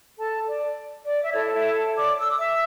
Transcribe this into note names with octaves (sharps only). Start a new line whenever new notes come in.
A4 A5
D5
D5
E5
E4 A4 C#5 D5
E4 E5
D5 D6
E6
D6
E5 E6